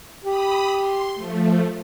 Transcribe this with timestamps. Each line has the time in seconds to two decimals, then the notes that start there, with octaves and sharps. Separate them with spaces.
0.24 G4 B5 D#6
0.79 C6
1.15 F3 A3